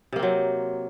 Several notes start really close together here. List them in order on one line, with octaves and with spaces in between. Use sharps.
C3 A#3 C4 F#3